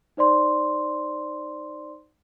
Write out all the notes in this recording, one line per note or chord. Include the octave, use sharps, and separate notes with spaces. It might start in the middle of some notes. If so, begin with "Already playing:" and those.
D#4 C5 D5 C6